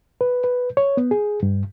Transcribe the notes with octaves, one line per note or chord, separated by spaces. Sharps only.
B4
B4
C#5
B3
G#4
G2